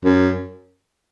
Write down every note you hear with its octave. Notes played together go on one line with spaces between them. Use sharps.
F#2